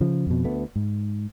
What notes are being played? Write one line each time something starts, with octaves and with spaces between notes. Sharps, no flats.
C#3 F3
F2 B2
D2 A3 B3
G#2